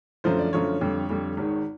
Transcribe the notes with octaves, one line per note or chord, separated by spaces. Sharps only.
F#2 D3 F3 A3 C5
D5
F#2 D3 F3 A3 C#5
F2 D3 G3
F2 D3 G3
G#1 G#2 D#3